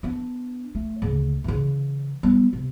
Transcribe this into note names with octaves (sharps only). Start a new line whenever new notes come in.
B3 D4
A3
D2 C#3
C#3 E3
G3 B3
C3